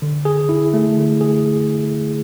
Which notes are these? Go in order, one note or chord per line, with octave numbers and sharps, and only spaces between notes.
D3
G#4
E4
A3
D3
G#4